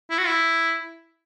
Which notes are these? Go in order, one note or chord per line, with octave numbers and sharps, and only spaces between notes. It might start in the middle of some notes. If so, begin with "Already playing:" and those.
E4
F#4
E4